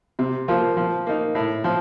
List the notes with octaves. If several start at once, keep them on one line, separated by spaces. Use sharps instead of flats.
C3
F3 A#3 F4
F3
A#3 D#4
A2
F3